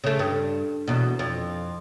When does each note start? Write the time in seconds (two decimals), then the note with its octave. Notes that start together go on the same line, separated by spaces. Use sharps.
0.04 C#3 A3
0.19 G2
0.88 E2 B2
1.19 F2